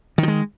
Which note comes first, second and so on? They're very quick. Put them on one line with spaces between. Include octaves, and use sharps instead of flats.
D#3 F3 G#3